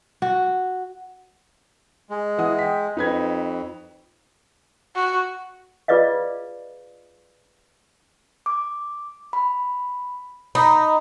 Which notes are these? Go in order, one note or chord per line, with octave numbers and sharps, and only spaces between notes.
F#4
G#3
E3 F#5 D#6
G5 B6
F2 D#4 B4 G#6
F#4
F4 G#4 B4 D5 D#5 F5
D6
B5
D#4 B5 D#6